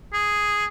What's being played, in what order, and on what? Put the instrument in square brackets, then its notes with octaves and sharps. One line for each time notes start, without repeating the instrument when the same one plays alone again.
[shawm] G#4